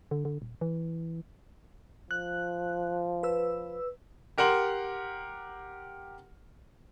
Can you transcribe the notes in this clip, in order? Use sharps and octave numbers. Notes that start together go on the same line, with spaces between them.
D3
D3
D#1
E3
F3 F#6
B4 E6
G4 A#4 F#5 C6 F#7